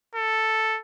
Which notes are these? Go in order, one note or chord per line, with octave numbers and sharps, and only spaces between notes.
A4